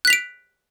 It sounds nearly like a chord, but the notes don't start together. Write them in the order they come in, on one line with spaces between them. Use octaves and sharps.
F#6 B6 F7 D7